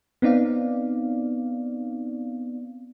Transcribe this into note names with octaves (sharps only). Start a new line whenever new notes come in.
B3 C4 D#4 D5 F5